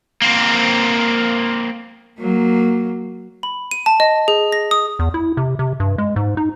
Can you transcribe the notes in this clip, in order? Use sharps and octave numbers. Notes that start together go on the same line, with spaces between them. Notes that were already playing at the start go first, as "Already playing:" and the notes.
A#3 C4
F#3 A#3
B5
D#7
A5
D#5
G#4
A#6
D#6
E2
E4
C3
C3
G2
G#3
G#2
D#4